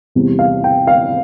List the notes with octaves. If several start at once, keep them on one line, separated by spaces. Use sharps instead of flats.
E2 C3 G3
F5
G5
F5